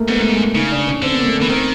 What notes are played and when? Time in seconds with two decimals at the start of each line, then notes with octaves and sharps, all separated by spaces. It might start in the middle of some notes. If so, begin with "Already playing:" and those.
Already playing: A3 A#3
0.09 G#2 B3
0.21 A3
0.32 G#3
0.55 C#3 D#4
0.71 D4
0.87 C#4
1.02 D3 C4
1.13 B3
1.20 A#3
1.26 A3
1.37 A#3
1.42 E3
1.49 D#3 C4